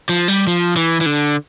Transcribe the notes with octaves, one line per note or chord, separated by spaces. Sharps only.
F3
G3
F3
E3
E3
D3